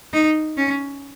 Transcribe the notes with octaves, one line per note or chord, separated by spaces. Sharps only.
D#4
C#4